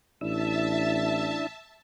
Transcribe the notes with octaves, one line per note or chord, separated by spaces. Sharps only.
A1 D4 E4 E5 A5 E6